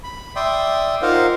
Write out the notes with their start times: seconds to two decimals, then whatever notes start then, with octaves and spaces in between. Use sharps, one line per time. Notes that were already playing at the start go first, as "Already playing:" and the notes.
0.03 B5
0.36 D5 E5 G5 C6 D#6
1.02 D#4 F4 A#4 C5 F5 F#5